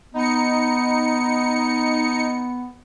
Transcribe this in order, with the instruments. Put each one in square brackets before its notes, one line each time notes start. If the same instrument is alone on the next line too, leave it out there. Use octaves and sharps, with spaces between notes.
[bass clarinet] B3 [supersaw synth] D#4 C#7